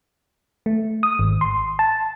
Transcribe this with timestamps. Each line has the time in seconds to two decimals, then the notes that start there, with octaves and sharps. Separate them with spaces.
0.66 A3
1.03 D#6
1.19 G#1
1.41 C6
1.79 A5